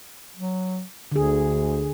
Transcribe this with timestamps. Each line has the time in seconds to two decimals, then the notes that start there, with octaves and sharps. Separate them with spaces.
0.37 F#3
1.12 D2 D3 G#4